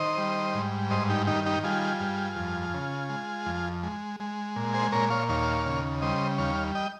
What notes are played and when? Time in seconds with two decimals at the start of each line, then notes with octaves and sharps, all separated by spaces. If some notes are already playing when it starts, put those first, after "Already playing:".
Already playing: D#3 C5 D#5
0.18 G3
0.54 G#2
0.90 G2 C5 D#5
1.10 D#4 G4
1.27 D#3 D#4 G4
1.46 D#4 G4
1.63 G3 F4 G#4
2.00 G2
2.36 F2
2.74 C#3
3.09 G#3
3.46 F2
3.83 G#3
4.20 G#3
4.56 A#2
4.74 G#4 C5
4.92 A#2 A#4 C#5
5.10 C#5 F5
5.29 D#2 C#5 F5
5.66 C#3
6.02 G3 C5 D#5
6.38 D#2 C#5 F5
6.75 D#5 G5